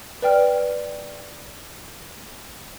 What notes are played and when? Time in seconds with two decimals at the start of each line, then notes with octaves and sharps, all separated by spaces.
0.22 B4 D5 G5 F6